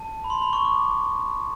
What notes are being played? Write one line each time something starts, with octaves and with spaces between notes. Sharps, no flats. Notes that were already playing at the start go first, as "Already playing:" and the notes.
Already playing: A5
B5
C6
B5
C#6
D6